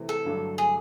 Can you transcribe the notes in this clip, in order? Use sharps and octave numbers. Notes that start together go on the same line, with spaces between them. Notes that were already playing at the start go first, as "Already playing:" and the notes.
Already playing: C3 E3 A3 C4
A4
G2 D3 F#3 A3 D4
G#4